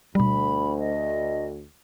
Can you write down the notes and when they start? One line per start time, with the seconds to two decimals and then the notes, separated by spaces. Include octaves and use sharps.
0.15 D2 B2 G3 B5
0.79 D#5